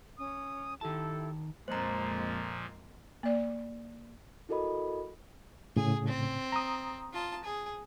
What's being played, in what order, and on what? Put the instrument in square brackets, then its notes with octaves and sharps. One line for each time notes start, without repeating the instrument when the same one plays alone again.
[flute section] C#4 D#6
[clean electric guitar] D#3 A5 [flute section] E4 G4 A4
[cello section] F2 G#3 A#3 [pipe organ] A#2 F3 [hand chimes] C5 A#5
[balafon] A#3 D5
[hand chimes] E4 F#4 A4 A#4 D#5 B5
[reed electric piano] A2 C#3 [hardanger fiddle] G#4
[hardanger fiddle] C4
[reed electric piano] A#5 D#6
[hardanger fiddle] F4 A5
G#4